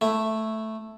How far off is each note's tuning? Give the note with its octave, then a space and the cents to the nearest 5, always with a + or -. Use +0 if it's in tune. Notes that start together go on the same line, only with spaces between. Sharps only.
A3 +0 E4 +0